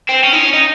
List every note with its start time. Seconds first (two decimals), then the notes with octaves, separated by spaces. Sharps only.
0.09 C4
0.24 C#4
0.33 D#4
0.38 C#4
0.53 D#4